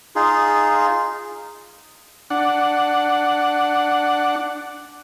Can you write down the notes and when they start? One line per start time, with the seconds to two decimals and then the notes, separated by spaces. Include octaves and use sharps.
0.15 D#4 F4 G#4
2.30 D4 F#5